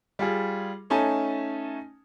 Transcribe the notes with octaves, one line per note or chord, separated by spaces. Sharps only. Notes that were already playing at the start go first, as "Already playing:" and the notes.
G3 F4 G#4
A3 C#4 D#4 G#5 A5